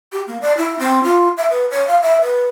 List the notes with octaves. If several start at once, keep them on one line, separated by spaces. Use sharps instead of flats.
G4
A#3
D5
E4
C4
F4
E5
B4
C#5
F5
E5
B4